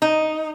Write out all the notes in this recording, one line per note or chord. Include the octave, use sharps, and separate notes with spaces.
D#4